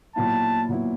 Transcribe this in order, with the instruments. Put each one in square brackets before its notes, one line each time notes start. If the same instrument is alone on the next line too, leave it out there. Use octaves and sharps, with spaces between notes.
[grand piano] A#2 F#3 B3 E4 [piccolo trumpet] A5
[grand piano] A#2 F#3 B3 E4